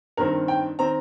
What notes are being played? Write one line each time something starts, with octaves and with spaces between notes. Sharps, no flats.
G2 D#3 C4 A#4
G5
D#3 C4 A#5